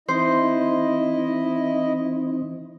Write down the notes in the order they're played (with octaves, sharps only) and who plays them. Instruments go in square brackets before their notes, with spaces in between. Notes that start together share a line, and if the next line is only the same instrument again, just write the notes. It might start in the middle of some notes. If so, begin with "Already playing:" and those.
[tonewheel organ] E3 C4 D#4 [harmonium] E4 D#5 [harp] C5